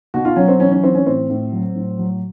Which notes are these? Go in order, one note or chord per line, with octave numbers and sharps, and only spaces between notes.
B2 F#4
F4
F#3 C#4
C4
E3 C#4
C#4
E3 C4
C#4
A2 C4
A2
F#3
A2
F#3